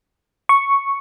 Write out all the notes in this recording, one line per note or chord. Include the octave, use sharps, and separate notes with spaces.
C#6